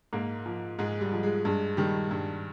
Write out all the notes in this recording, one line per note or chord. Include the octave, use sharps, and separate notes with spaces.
G#2 A#3
F3
G#2 G#3
G3
F3
G#3
G2 G#3
D#3 G3
G2